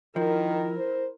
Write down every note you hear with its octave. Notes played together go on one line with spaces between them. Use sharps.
D#3 F3 E4 A#4
C5